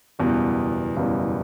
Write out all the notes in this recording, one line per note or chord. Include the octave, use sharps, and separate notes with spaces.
F#1 E2 B2 G3
F#1 E2 B2 G3